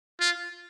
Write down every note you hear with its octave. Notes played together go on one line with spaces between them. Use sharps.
F4